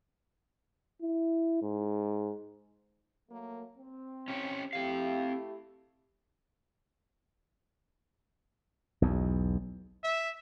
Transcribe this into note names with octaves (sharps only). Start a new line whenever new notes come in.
E4
G#2
F#3 A3 A#3
C4
C#4 G4 C#5
A3 C4 E4 G4 F5
B1 E2
E5